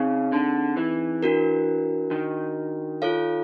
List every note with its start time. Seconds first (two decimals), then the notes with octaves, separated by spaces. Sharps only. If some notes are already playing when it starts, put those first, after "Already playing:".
Already playing: C#3 C4 D#4 G#4
0.32 D3
0.77 E3
1.23 D4 F#4 A#4
2.11 D#3
3.02 F4 A4 C#5 F5